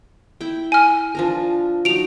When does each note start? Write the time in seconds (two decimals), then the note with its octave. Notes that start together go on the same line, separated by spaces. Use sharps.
0.41 E4 G5
0.72 G#5 F6
1.15 F3 D4 A#4
1.85 F#3 D#4 D7 F7